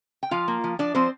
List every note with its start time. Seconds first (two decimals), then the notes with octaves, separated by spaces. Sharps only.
0.23 G5
0.31 F3 F4 F5
0.48 A#3
0.64 F3
0.79 F3 D4 D5
0.95 F3 C4 C5